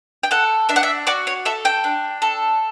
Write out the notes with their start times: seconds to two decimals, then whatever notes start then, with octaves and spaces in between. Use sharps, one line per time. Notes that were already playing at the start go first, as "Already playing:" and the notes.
0.23 G5
0.31 A4 F#5
0.69 D4 E5
0.76 F#5
0.83 E5
1.07 F#4 D5
1.27 C#5
1.45 A4 E5
1.65 G5
1.84 D4
2.22 A4